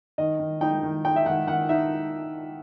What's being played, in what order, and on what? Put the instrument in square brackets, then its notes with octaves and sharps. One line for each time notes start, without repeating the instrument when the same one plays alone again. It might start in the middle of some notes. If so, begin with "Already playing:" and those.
[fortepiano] D#3 D#5
D#3
D#4 G5
D#3
D#4 G5
E5
D#3 F#5
D#3 F#5
D#4 E5